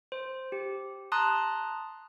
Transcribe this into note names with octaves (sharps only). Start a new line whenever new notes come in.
C5
G4
A5 A#5 C6 D#6 F#6